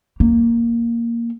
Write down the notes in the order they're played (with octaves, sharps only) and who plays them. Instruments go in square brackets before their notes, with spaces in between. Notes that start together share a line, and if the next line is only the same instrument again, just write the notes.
[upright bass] A#3